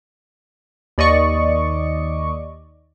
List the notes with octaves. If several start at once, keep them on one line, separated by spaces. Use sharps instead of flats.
D#2 D5 D#5 C#6